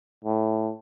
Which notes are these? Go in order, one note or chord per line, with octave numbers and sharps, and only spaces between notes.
A2